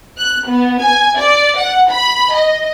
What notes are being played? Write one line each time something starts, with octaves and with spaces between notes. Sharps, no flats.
F#6
B3
G#5
D5
F#5
B5
D#5